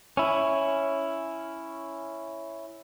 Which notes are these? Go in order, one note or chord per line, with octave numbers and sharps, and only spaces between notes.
C#4 E4